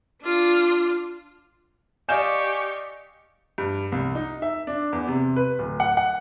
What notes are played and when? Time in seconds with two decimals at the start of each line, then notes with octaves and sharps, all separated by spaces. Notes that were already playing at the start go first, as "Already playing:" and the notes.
0.22 D4 F4
2.09 G4 D5 D#5 F5 G#5 C#6 G6 E7
3.58 G2
3.92 C2
4.15 D#4
4.42 E5
4.67 D4
4.93 E2
5.08 C3
5.36 B4
5.59 D1
5.80 F#5
5.97 F#5